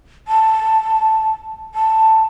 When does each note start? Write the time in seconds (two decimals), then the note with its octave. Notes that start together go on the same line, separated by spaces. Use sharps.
0.28 A5
1.74 A5